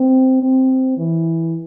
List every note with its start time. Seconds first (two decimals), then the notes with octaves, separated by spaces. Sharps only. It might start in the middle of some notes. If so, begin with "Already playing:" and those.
Already playing: C4
0.42 C4
0.97 E3